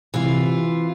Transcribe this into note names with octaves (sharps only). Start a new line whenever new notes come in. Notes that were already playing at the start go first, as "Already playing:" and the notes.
C3 E3 F4